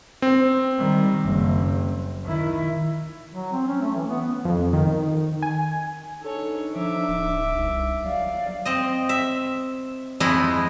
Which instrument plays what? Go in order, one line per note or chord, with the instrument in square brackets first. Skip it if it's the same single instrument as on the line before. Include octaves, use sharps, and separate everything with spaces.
[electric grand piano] C4
[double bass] D#3 G3
F#1
D#3 E4
[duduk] F#3
C4
C#4
A3
E3
B3
B3
[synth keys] F2
D#3
G#5
[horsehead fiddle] D4 D#4 [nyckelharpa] A4 C#5
[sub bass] F3 [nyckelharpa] E5 D6
[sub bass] D1
C2
[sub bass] F#3 [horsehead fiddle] D5 F5
[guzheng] C4 D#5
E5
F2 G#3 E4 D#5 B5